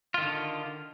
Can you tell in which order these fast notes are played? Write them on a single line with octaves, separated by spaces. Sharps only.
F4 D#3 D3